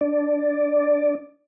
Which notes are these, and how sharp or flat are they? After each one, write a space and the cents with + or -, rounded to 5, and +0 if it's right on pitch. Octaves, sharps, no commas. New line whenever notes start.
D4 +0 D5 +0